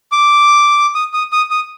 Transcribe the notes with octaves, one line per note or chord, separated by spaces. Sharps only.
D6
D#6
D#6
D#6
D#6